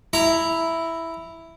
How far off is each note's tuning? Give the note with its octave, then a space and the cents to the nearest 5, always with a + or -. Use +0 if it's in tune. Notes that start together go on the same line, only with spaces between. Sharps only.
E4 +0 A#5 -15